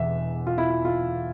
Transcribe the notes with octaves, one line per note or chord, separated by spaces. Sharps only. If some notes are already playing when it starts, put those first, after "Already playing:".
Already playing: E1 E2 E5
F4
E4
F4
F4